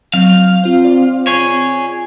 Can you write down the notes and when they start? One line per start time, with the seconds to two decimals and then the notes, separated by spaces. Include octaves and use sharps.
0.14 F#3 C4 F5
0.64 C4 F4 C5
0.82 F4 D5
1.27 G#4 C#5